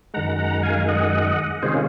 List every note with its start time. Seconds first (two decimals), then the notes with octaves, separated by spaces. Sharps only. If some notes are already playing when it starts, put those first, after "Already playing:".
0.14 F#2 D#3 G#3 F#5 A#5
0.39 F#5 A#5
0.63 F5 G#5
0.88 D#5 F#5
1.62 C3 D#3 G#3 C#4 F4 G#4 C5